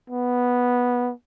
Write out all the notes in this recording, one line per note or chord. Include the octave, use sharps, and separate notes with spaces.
B3